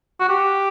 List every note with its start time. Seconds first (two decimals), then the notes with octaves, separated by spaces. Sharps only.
0.20 F#4
0.29 G4